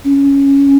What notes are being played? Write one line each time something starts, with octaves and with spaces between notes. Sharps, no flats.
C#4